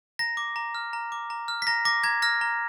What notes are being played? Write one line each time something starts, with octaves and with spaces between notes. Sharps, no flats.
A#5 A#6
D6
A#5
F6
A#5
D6
A#5
F6
B6
A#5 A#6
D6 A#6
A#5 G#6
F6 A#6
A#5